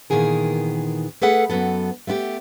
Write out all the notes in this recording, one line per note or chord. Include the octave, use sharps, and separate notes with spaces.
A#2 D#3 E3 B3 G#4 A#4
A3 G#4 A4 B4 F#5
F#2 F#3 B3 A4
A3 B3 E4 G4